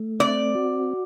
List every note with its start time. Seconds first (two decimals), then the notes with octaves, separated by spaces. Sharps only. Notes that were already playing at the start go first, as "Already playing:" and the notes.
Already playing: A3
0.19 C4 D5
0.55 F#4